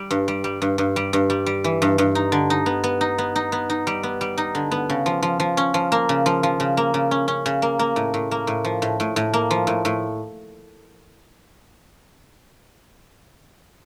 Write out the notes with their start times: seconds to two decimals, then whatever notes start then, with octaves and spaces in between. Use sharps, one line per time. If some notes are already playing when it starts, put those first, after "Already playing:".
Already playing: G3
0.11 G2
0.28 G3
0.44 G3
0.62 G2
0.78 G2
0.96 G3
1.13 G2
1.30 G3
1.46 G3
1.64 E3
1.82 G2
1.98 G2
2.15 D#4
2.32 D3
2.50 D#4
2.66 B3
2.84 B3
3.01 D#4
3.18 B3
3.36 D#4
3.52 B3
3.70 D#4
3.87 G3
4.03 B3
4.21 G3
4.38 D#4
4.55 D3
4.71 B3
4.90 C#3
5.06 F3
5.23 F3
5.40 F3
5.57 C#4
5.74 F3
5.92 A#3
6.09 C#3
6.26 F3
6.43 F3
6.60 C#3
6.77 A#3
6.94 C#3
7.11 C#4
7.28 C#4
7.46 C#3
7.62 A#3
7.79 A#3
7.96 A2
8.14 A2
8.31 A#3
8.47 A2
8.65 F3
8.82 A2
9.00 A2
9.16 A2
9.33 A#3
9.51 F3
9.67 A2
9.85 A2